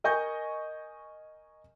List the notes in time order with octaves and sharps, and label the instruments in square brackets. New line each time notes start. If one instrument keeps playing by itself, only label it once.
[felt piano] A#4 D#5 G#5 C#6 G6